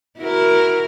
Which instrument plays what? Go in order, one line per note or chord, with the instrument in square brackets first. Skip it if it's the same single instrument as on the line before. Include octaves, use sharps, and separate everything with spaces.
[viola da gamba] E4 F#4 A#4